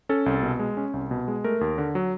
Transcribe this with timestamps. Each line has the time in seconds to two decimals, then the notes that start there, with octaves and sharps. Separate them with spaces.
0.09 C#4 A4
0.26 C2
0.43 B2
0.59 G#3
0.77 C#4
0.94 C2
1.11 B2
1.28 G#3
1.44 A3 A#4
1.61 D#2
1.78 D3
1.95 F#3